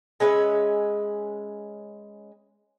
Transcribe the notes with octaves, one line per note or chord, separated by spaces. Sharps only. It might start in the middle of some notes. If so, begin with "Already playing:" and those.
G#3 C#4 B4 E5